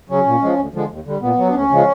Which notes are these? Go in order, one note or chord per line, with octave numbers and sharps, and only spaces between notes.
C#3 F#3 C#4
A#2
F3 G#3
D2
D3 F3 G#3
D#2
D3 G3
A#2 B3
F#3
D4
D2 C#4
C#3 F3 G#3